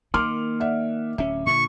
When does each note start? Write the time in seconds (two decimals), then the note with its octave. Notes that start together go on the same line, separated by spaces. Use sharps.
0.14 D#3 A#3 C6 D6 F6
0.60 D5 E5 F#5
1.18 D1 C#4 E5
1.47 A#2 D3 C#6